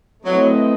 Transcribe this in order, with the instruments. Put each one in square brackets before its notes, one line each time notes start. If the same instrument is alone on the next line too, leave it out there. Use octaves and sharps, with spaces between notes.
[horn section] F#3 [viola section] A3 C4 E4 B4 D#5